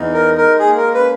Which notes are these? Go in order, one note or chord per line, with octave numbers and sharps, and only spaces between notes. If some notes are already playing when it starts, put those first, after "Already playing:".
Already playing: E2 D#4
A#4
G#3
A#4
A#3 G#4
A#4
C#4 B4